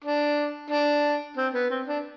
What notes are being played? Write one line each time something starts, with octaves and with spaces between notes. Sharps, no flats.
D4
D4
C4
B3
C4
D4